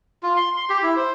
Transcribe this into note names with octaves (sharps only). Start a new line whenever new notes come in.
F4
C6
C6
G4
E4
C5